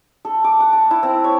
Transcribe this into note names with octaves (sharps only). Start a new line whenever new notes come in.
A4
D6
F#5
A5
E4
C4
C#5